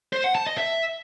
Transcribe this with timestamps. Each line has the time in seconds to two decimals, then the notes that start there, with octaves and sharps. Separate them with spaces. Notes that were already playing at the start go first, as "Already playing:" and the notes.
0.13 C5
0.24 F#5
0.35 A5
0.47 D#5
0.58 E5